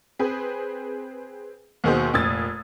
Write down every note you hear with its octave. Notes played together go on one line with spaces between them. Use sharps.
C4 G#4 B4
D#2 B2 D#3 F#4 G#4 C5
F1 A#2 D#6 E6 G#6 A6